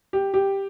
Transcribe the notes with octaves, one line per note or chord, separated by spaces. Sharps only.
G4
G4